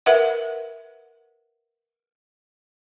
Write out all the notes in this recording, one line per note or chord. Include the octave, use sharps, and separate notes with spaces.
A#4 B4 E5 F#5